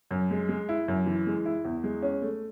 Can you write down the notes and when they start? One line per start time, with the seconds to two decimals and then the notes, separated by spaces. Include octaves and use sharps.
0.11 F#2
0.31 G#3
0.49 G#3
0.69 E4
0.88 F#2
1.06 E3
1.27 G#3
1.45 E4
1.65 E2
1.84 G#3
2.02 C#4
2.22 A3